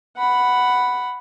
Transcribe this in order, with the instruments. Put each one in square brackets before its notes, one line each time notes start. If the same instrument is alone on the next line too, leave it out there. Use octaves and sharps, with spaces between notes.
[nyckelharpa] F#5 B5